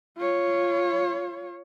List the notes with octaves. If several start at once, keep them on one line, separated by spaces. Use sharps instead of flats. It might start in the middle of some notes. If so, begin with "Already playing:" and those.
F4 C#5